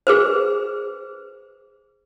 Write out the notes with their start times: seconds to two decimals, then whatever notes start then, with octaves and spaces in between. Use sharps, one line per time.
0.07 G#4 B4 C5